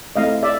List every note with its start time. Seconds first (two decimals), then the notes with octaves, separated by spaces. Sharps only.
0.16 A3 C4 E4 D#5 F5
0.43 D5 E5